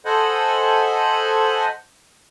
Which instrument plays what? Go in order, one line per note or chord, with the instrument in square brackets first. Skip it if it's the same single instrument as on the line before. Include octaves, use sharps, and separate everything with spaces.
[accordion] A4 C5 D#5 F#5 G#5 B5